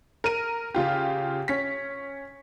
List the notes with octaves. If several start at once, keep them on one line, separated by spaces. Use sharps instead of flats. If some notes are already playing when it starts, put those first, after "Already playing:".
A#4 D#7
C#3 F4 G4
C#4 B6